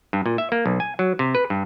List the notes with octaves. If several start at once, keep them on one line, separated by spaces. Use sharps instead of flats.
G2
A#2
E5
A#3
B1
G#5
F#3
C3
B4
G2